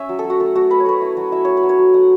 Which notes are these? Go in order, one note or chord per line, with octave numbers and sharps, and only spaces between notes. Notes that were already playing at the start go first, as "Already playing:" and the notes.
Already playing: C#4 E5
F#3
A4
F#3
F#4
A3 A4
A3 F#4
A3 B4
C#5
A3 B4
E4
F#3
E4 E5
A3 C#5
B4
F#3
C#5
F#3
A3 F#5